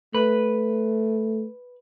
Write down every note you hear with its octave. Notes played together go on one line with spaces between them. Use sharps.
A3 B4